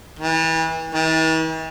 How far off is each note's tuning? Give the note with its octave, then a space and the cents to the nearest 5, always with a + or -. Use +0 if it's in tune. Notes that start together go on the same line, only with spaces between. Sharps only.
E3 -30
E3 -45